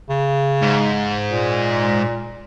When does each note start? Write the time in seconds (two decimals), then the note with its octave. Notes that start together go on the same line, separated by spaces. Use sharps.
0.10 C#3
0.62 G#2
1.28 A#2